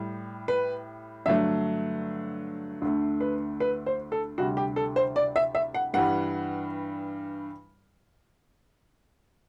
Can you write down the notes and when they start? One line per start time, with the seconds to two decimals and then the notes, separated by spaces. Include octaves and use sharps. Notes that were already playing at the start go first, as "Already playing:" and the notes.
Already playing: A2 G3
0.48 B4
1.26 G2 D3 F#3 A3 E5
2.82 D2 D3 A3
3.20 B4
3.60 B4
3.86 C5
4.12 A4
4.38 D2 C3 G3 F#4
4.57 G4
4.76 A4
4.96 C5
5.16 D5
5.36 E5
5.55 E5
5.74 F#5
5.94 G2 E3 G3 F#5